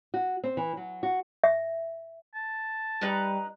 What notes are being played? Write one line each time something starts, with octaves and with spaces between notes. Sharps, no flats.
F#4
C4
E3
F#3
F#4
E5
A5
G3 D#4 B4 A#5